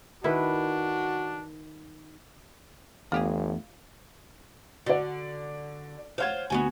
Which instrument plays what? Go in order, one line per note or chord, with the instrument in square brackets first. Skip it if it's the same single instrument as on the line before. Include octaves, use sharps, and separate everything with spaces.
[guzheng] D#3 [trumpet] D4 [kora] E4 B4 [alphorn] F#4
[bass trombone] G1 [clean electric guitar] E2 [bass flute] A3 [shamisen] F4 G4 G#4
[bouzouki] D3 [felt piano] F#4 D5
[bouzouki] F4 C5 F5 [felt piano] C#5 F#5 G#6
[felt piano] D2 [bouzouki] B3 F#4 G#5